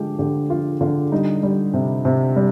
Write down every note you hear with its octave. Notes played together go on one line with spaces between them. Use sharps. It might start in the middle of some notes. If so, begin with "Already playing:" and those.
Already playing: D3 F3 G#3 F4 G4
D3 G4
F3 F4
D3 F4
G3 D#4
G3
C3
C3
G3